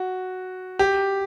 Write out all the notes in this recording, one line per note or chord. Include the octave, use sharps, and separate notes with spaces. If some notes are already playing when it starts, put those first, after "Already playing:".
Already playing: F#4
G4